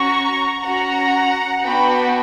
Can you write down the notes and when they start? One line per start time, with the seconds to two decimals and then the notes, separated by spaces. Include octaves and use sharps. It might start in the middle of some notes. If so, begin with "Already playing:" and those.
Already playing: C#4 F#4 A#5 C#6
0.64 C#4 F#4 F#5 A#5
1.64 B3 D4 F#4 G5 B5